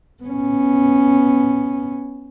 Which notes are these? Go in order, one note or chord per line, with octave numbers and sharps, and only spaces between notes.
B3 C#4